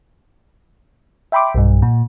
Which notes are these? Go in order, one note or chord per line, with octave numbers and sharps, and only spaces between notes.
E5 G5 B5 C6 D6
B1 G2
A#2